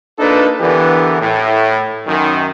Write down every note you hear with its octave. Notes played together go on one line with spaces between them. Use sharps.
A#3 D4 D#4 F4 A4 B4
D3 E3 B3 D4 G4 A#4
A2
F#2 D#3